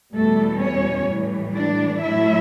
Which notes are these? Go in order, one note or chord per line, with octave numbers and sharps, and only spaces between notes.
E2 B2 G3 A3 A4
C#4 C#5
A2 E3 G3
D4 D5
A2 F#3 A3 E4 E5